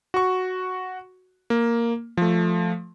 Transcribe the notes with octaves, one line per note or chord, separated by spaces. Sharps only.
F#4 C#6
A#3
F3 A3